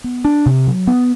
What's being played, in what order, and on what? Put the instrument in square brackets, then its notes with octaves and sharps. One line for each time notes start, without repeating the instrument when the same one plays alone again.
[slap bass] B3
D4
C3
F#3
B3